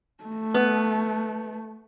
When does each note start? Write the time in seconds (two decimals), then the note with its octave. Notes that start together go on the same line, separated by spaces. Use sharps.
0.24 A3
0.54 B3